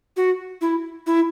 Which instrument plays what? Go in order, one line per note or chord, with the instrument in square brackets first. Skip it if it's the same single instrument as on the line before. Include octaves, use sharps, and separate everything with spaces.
[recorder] F#4
E4
E4